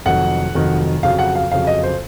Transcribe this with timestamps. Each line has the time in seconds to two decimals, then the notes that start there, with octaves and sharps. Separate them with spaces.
0.05 F1 F2 D#3 F#3 F#5
0.54 F1 F2 D#3 F#3
1.03 F2 C#3 F#3 F5
1.19 F#5
1.35 F5
1.52 F2 C#3 F#3 F5
1.67 D#5
1.83 C5